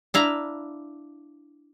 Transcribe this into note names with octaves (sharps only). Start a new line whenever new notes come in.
D4 E4 F5 A#5